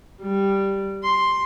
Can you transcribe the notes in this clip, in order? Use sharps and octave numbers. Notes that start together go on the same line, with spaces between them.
G3
C6